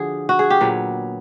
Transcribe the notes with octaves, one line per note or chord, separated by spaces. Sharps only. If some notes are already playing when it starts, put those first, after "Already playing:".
Already playing: D3 F3 F#4 G#4
F#4
G#4
G4
A#2 F#3 B3